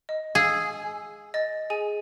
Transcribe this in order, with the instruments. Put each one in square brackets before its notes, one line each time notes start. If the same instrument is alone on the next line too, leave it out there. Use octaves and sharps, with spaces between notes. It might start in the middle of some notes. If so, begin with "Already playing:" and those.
[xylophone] D#5
[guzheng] G#4 [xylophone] F5 E6
[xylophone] D#5 A6
G#4 G#5 D#7